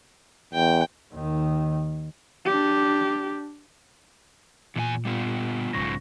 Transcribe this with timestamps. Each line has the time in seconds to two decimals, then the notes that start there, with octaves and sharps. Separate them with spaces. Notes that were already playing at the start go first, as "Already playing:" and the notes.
0.54 E2 G5
1.14 D#2 D#3
2.46 D4 G4
4.75 E2 A#2 D4 G#5
5.05 G3 B3 F4
5.73 B1 G#2 C#3 F3 C#6 A#6